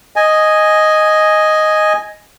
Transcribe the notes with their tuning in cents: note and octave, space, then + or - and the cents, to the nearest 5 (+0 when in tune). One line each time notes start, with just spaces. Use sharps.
D#5 +0 G#5 +0